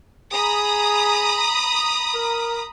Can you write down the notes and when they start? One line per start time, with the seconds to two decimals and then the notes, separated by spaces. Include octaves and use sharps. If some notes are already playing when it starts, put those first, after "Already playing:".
0.33 G#4 A#5 B5 D#6
2.15 A#4